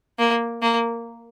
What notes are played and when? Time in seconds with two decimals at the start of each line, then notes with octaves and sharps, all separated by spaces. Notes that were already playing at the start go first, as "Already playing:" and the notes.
0.19 A#3
0.62 A#3